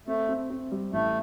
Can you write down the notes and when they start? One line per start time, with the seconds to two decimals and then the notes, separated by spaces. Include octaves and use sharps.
0.07 A3 C4
0.29 C4
0.50 C4
0.72 G3
0.93 A1 A3